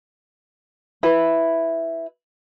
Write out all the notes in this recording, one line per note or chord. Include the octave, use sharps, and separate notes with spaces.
E4 B4